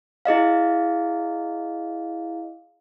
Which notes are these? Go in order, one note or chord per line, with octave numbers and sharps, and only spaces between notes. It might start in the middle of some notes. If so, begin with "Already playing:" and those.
E4 G#4 D#5 F5